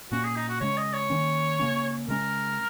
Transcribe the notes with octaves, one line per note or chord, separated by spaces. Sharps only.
A#2 A#3 C#4 F#4
G#4
D#4
F#4
C#3 G#3 C#4 C#5
D#5
C#5
D#3 A#3 C#4
C#3 A#3 C#4
C#3 G#3 C#4 A#4